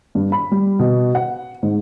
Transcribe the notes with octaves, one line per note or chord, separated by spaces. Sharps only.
G2
B5
G3
B2
F#5
G#2